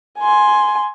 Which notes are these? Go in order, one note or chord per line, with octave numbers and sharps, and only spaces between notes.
G#5 C6